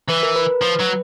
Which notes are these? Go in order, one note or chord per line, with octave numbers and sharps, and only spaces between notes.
E3 B4
A#4
B4
F3
F#3